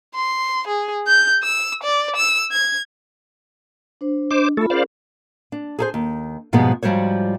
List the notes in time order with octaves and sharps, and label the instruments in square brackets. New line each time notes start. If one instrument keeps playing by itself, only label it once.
[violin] C6
G#4
G6
E6
D5
E6
G#6
[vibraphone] D4 C5
[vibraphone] D4 D#5 [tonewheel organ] C5 D6
[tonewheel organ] A3 A4 [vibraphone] F4 B5
[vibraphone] C#4 G#4 A#4 [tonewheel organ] C5 D5 F5
[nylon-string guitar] D4
G#4 A4 C5
D#2
G#2 B2 F3 G3 G#3 B3
G#2 F3 G3 F#4 C5 C#5